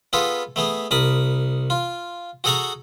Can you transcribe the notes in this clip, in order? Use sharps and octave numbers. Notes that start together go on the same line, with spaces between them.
B3 F4 G#4 A4 B4
A3 B3 G#4
C2 A#4 A5 B5 D#6
F4
F#4 G#4 A4 F#5 A#5 C#6